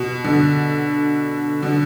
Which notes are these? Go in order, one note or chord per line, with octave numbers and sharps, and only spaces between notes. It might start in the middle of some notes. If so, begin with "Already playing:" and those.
Already playing: B2
B2 D3
B2 D3